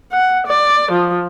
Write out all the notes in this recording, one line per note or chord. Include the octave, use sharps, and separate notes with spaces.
F#5
D5
F3